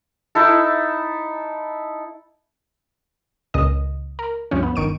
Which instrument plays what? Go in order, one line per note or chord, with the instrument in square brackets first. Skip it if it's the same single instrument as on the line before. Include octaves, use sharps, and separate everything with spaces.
[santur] D#4 E4 A4
[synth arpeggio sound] C#2 A#2 D#5
A#4
D2 G2 F3 C#4
B3
G1 D#3 C#6 D7 D#7